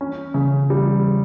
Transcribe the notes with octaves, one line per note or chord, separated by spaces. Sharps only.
C#4
C#3
G3